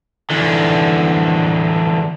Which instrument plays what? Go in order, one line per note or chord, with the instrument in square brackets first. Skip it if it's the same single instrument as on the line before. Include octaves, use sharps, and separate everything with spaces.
[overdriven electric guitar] E2 D3